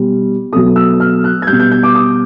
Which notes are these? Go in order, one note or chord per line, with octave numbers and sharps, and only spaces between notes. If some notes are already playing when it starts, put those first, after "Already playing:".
Already playing: B2 G3
B2 F#3 A3 D#6
E6
F6
F#6
G#6
B2 G3 G6
G6
G6
D6
D#6